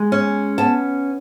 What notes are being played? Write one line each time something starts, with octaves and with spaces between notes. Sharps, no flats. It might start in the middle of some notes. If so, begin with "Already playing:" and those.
Already playing: G#3
C#4
B3 A5